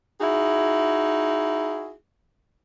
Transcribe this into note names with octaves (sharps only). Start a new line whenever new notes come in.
D#4 E4 F#4 G#4